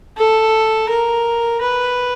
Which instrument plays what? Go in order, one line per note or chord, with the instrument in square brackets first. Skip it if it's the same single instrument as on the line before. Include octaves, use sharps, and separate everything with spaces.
[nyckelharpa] A4
A#4
B4